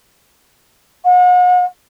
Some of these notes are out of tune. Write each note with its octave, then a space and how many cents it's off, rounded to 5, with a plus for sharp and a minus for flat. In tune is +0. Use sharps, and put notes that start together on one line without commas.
F#5 -40